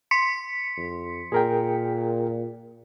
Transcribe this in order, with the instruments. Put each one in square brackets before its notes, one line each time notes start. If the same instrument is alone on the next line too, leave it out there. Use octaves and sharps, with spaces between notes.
[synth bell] C6 B6 C#7
[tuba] F2
[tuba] A#2 [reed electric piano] G#4 A#4 G5